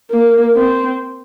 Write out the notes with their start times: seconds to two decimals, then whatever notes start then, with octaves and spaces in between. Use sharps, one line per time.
0.11 A#3
0.55 C4